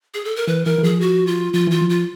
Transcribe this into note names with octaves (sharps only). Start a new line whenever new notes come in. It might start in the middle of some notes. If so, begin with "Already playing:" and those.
G#4
A4
A#4
E3 B4
E3 A#4
E3
F3 G#4
F#4
F4
F3 F4
E3 F4
F3
F4